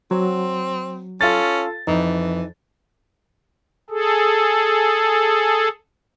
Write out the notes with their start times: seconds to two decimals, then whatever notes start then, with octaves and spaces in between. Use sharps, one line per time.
0.11 F#3 C4
1.21 C#4 F4 A4 A6
1.87 F2 E3 D#4
3.90 G#4 A4